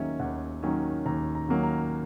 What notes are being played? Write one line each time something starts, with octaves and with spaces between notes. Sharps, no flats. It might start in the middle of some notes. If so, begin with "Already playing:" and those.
Already playing: D#2 D#3 F#3 A#3 C#4 D#5 E5
D#2 F#5
D#3 F#3 A#3 C#4
D#2 A#5
A#5
D#3 F#3 A#3 C#4
A#5